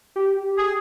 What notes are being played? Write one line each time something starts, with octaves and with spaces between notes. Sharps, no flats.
G4
G#4